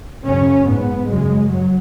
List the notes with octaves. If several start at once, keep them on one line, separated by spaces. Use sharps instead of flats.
F#2 C#3 C#4
G#2 B3
F#2 C#3 G#3
F#2 F#3